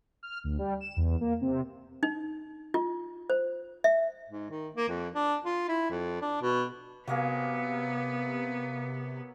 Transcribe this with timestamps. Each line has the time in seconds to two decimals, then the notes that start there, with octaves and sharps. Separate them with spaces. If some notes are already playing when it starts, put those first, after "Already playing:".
0.23 F6
0.44 D2
0.58 G3
0.81 E7
0.97 E2
1.21 A#3
1.41 C3
2.03 D#4
2.74 F4
3.30 C5
3.84 E5
4.29 G#2
4.51 D#3
4.75 A#3
4.89 F2
5.15 D4
5.45 F4
5.68 E4
5.90 F2
6.21 D4
6.42 B2
7.08 C3 F#3 A#3 B3 G#4 F5